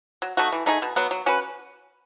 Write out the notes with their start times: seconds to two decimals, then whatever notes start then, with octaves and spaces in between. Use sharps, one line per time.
0.22 F#3
0.37 A3 D#4 F#4
0.52 E3
0.66 A3 D#4 G#4
0.82 B2
0.96 F#3 B3
1.11 F#3
1.26 C#4 F#4 B4